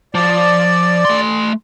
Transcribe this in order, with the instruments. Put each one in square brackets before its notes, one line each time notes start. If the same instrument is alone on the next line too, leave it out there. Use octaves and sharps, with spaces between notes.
[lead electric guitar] F3 [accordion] D5
[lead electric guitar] A3 C6